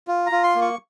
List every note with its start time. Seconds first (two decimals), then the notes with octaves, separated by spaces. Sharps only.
0.08 F4
0.26 A#5
0.32 F4
0.44 C6
0.55 A#3
0.61 C#6